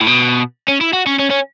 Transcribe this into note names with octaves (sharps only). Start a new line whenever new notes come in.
A2
B2
C#4
E4
F#4
C#4
C#4
C#4